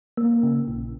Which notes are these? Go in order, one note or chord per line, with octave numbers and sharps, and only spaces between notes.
A#3
C#3
A#1